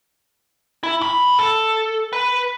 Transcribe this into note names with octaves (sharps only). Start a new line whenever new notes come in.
E4
D2 B5
A4
B4